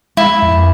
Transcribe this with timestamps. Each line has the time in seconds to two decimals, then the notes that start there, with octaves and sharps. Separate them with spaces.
0.17 G#3 E4
0.42 F2